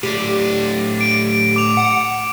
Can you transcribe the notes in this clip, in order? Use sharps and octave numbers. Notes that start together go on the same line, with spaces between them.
A2 D4 G4
D7
D6 F7
F#5